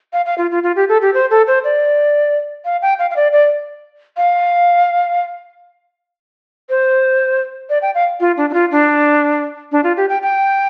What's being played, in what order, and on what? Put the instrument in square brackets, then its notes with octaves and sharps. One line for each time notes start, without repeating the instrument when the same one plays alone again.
[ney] F5
F5
F4
F4
F4
G4
A4
G4
C5
A4
C5
D5
F5
G5
F5
F5
D5
D5
F5
C5
D5
G5
F5
F4
D4
D4
F4
D4
D4
F4
G4
G5
G5